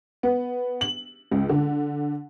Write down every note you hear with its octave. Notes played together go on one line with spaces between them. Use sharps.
B3
F#7
C#2
D3